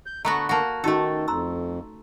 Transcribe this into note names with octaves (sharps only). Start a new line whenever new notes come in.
G6
D3 A3 B3 F#4 A#5
A#3 F#4 F#5 A5
D#3 A3 C#4 D#4 F#4 A4
F2 A#5 C6 E6